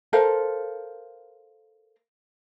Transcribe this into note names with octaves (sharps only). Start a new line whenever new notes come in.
A4 A#4 C5 F5